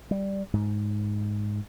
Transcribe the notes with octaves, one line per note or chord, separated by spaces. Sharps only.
G3
G#2